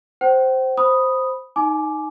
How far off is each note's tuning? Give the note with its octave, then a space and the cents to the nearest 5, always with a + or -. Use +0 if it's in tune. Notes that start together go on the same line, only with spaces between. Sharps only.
C5 +0 G5 -40
C5 +0 B5 +0 D#6 +0
D#4 +0 G#5 +25 D6 +0